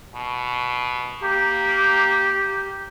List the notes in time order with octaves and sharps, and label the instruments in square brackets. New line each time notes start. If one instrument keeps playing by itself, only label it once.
[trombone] B2
[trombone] A#3 [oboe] G4